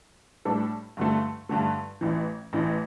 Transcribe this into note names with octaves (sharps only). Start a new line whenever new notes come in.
A2 G3 D4 A4
G2 D3 A3
G2 D3 A3
A1 A2 E3
A1 A2 E3